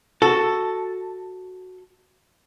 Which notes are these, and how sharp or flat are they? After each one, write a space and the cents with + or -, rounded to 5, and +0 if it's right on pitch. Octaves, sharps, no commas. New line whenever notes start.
F#4 +0 A4 +0